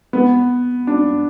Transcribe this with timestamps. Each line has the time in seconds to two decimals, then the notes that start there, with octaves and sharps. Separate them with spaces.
0.13 B3
0.87 D4